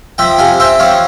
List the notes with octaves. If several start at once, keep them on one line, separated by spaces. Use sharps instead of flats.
F3 E5 G5
C3 F5 G#5
C4 E5 G5
F3 C#5 F5